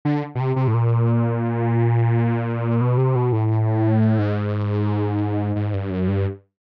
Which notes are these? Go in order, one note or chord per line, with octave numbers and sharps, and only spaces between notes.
D3
B2
C3
C3
A2
A#2
B2
C3
B2
A2
G#2
G#2
G2
F#2
G2